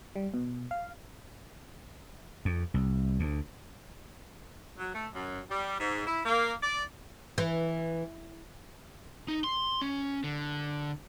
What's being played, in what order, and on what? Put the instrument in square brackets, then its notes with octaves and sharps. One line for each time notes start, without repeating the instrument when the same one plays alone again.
[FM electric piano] G3
B2
F5
[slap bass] F2
C2
D2
[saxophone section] F#3
A3
F#2
G3
G#2
E4
A#3
D5
[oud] E3
[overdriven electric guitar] D#4
C6
C#4
D3